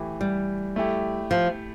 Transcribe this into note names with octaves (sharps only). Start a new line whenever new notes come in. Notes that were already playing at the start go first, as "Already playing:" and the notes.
Already playing: E3 A3 E4 G4
G3
A3 E4 G4
F3